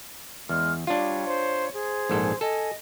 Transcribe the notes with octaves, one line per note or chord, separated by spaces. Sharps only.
E2 G#3 F6
G3 D4 F4 C#5
C5
G#4 C5
A#1 G#2 A4
A4 D#5 G#5